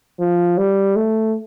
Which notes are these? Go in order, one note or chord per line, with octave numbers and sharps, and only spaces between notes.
F3
G3
A3